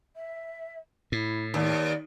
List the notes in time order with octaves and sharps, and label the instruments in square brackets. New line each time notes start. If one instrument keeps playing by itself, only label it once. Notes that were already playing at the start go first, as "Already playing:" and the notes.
[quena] E5
[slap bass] A2 [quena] E4
[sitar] D#2 [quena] D5